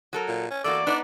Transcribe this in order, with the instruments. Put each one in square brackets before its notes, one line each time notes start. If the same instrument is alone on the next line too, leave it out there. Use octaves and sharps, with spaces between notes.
[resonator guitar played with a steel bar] F#3 A4 A#4
[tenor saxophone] A#2
C#4
[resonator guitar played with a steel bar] E2 A#3 F#4 [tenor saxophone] A4 [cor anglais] D5
[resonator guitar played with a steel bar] B3 D#4 [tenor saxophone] D4